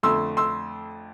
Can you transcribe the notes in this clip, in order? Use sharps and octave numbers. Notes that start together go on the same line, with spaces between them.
F2 D3 A3 C6 E6
C6 E6